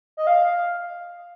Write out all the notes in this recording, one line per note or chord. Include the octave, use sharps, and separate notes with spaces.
D#5
F5